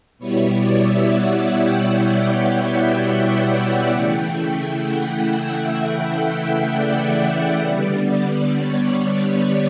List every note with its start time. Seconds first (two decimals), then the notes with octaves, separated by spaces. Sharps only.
0.19 B2 G3 B3 E4 C#5
0.50 D5
0.81 E5
1.12 F#5
1.59 G5
2.05 F#5
3.91 C#3 E3 A3 E4 G5
4.84 F#5
5.31 E5
5.77 E5
6.70 D5
7.63 D3 G3 B3
8.57 C#5